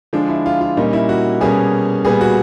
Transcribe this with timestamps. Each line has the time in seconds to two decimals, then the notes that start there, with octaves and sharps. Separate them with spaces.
0.13 D3 F3 G#3 D4
0.29 E4
0.46 F4
0.61 F4
0.77 A#2 G3 A#3 C#4 D#4
0.93 E4
1.09 F#4
1.41 B2 G3 A#3 C#4 G#4
2.04 A#2 G3 B3 G#4
2.21 F#4